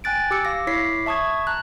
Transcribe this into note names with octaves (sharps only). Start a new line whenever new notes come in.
G5 G#5 F#6 A6 D7
G4 D6 E6 C#7
F5 E6 A#6
E4 C#5 D6 B6 C7
E5 A5 C#6 D#6 G#6
A5 A#5 F#6